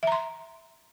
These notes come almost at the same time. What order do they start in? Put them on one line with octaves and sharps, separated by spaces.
E5 A#5 C6